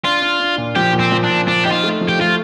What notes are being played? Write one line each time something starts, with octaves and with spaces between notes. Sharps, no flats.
D4 F4
D4
D4
A#2
F3 G4
A#2
C4
F3
D4
A#2
F3 D4
D#4 G4
F4
A3
F3
G4
A3 F4